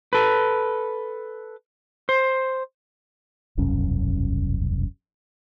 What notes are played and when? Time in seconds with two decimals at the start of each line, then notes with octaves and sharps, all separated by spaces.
0.13 A4 B4
2.09 C5
3.58 E1 C2 F#2 C#4